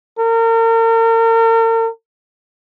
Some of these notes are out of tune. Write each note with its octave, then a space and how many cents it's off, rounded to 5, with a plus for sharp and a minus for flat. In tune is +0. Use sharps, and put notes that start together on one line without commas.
A#4 -40